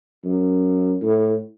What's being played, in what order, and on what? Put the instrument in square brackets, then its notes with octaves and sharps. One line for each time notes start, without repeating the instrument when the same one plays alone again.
[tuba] F#2
A2